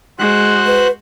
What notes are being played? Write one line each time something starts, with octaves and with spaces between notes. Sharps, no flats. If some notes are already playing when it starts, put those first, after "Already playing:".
G#3 F#4 C5 F#6
B4